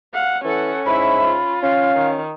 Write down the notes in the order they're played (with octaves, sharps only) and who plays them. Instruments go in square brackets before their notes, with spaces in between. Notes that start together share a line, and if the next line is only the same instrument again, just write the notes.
[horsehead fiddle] F5 [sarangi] F#5
[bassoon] E3 [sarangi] C#4 [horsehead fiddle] A4 F#5
[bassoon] G#2 [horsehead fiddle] E4 E5 [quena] B5
[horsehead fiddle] F4
[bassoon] C#4 [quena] F5
[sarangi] D#3